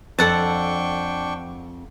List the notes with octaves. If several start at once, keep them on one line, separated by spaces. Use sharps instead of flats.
F2 D4 A4 F#5 G5 A5 C#6